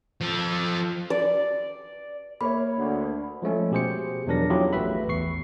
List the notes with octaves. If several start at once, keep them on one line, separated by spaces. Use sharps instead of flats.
F3 A4
D5
A#3 C#5 E5 B5
D2
F3 G#3 A3 C#4
B2 G4 G#4 C5 C#7
E2 F3 F#3 D4 A#4 A#6
F#3 C#4 E4 F4 G4 G#4
A1 A3 F#4 B4 E5 B5
A1 E2 C#6 C7